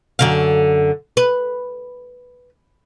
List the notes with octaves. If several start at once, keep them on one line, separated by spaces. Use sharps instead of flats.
F#2 D3 F5
B4